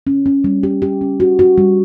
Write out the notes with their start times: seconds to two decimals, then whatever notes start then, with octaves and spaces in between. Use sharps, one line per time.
0.07 C#4
0.26 C#4
0.44 G3
0.63 G4
0.82 G4
1.01 C#4
1.20 F#4
1.39 F#4
1.58 G3